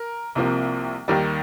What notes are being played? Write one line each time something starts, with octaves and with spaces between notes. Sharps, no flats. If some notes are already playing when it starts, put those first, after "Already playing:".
Already playing: A#4
C2 C3 F3 A#3
D#2 D#3 G3